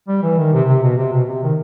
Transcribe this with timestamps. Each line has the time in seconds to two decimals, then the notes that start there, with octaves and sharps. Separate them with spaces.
0.08 G3
0.23 E3
0.38 D#3
0.53 C3
0.69 C3
0.83 B2
0.98 C3
1.12 B2
1.28 C3
1.43 D#3